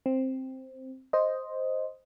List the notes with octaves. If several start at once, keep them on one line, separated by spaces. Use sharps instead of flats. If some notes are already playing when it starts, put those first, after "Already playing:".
C4
C5 D#5